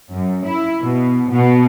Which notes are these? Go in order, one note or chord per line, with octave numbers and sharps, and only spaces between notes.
F#2
E4
B2
B2